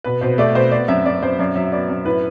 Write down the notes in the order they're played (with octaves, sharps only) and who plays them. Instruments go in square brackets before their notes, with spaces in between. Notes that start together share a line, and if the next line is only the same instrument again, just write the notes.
[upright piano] B2 B4
B2 C5
A3 D5
B2 C5
B3 D5
F#2 E5
F#2 D5
F#2 C5
F#2 D5
F#3 E5
B3 D5
F#2
A2 B4